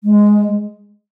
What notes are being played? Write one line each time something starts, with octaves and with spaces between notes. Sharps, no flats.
G#3